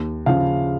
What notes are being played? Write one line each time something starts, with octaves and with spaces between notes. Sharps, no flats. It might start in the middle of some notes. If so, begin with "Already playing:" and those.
Already playing: D#2
C#3 F3 F5